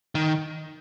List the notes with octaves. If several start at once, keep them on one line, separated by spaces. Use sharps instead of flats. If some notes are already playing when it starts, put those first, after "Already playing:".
D#3